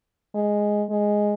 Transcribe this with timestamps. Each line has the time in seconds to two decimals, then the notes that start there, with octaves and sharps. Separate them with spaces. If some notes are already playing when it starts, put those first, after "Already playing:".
0.35 G#3
0.90 G#3